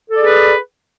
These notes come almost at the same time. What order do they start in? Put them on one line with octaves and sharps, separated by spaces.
A4 D5 G#4 B4